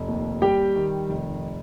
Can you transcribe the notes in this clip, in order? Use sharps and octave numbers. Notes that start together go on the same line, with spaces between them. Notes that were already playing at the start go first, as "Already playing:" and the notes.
Already playing: F1
D#2
G3 G4 G5
D#3
F1